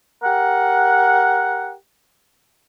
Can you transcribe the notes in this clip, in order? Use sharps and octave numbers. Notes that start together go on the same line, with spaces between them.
G4 A#4 F#5